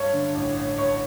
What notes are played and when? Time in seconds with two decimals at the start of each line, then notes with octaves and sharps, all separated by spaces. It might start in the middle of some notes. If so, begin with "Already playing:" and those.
Already playing: G2 C#5
0.13 D3
0.35 A1
0.57 A1
0.78 A1 C#5